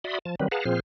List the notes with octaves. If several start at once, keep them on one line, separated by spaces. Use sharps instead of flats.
F#4 D5 E5 B5 C6 D#6
F3 A5
D#3 F#3 G3 C4 B4
G#4 B4 F5 F#5 A5 A#5
A#2 F3 C4 G#4 C5 F6